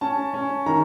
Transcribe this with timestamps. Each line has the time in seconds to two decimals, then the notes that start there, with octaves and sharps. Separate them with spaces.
0.01 C#4 A5
0.34 C#4
0.66 D#3 A#5